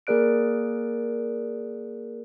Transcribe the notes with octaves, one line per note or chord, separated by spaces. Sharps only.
A#3 G#4 A#4 D5 F#6 D7